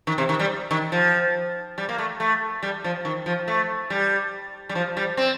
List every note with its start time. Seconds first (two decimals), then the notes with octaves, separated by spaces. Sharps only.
0.07 D#3
0.18 C3
0.29 D#3
0.40 G3
0.71 D#3
0.92 F3
1.78 G3
1.89 A#3
1.98 A3
2.20 A3
2.63 G3
2.84 F3
3.05 D#3
3.26 F3
3.48 A3
3.90 G3
4.69 G3
4.75 F3
4.97 G3
5.17 C4